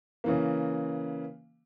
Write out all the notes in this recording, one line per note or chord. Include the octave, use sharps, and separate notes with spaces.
C#3 E3 A#3